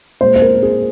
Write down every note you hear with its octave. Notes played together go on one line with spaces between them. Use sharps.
A#2 G#3 C5
C5
A#4
G#4